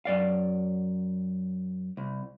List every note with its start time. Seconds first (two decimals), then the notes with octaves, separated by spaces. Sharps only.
0.05 F#2 D5 F5
1.97 C2